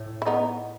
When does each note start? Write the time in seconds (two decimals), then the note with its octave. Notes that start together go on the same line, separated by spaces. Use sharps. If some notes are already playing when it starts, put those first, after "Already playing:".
Already playing: A2
0.22 E4
0.26 B3 D#4